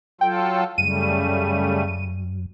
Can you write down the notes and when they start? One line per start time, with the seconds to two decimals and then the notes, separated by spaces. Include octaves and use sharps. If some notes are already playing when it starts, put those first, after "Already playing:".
0.21 F#3 F4 A4 G5
0.78 F#2 C#3 G3 A3 D#7